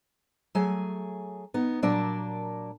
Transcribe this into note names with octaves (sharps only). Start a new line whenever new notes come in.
F#3 A3 G#4 G#5
B3 D#4
A#2 F#3 A#3 D4 D5 A5